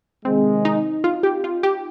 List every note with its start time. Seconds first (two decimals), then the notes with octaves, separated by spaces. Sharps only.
0.25 C3 D#3 G#3 C4
0.65 D#4
1.04 F4
1.23 G4
1.44 F4
1.63 G4